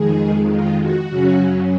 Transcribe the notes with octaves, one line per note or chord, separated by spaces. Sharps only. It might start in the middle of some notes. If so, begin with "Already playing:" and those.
Already playing: F2 D#3 G#3 G#4
F4
F#4
F#2 C#3 F#3 C#4